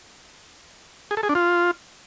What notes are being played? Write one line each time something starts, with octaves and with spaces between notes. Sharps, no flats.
G#4
A4
G#4
D4
F4